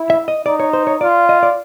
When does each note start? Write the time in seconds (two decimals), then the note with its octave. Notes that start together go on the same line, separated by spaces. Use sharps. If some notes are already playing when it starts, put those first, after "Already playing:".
Already playing: E4
0.10 E5
0.28 D#5
0.46 D#4 D5
0.60 C#5
0.73 C5
0.87 C#5
1.01 F4 D5
1.29 D#5
1.43 D5